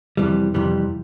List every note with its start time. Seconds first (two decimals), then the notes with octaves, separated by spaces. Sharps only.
0.17 F2 C3 E3 G3
0.54 F2 C3 E3 G3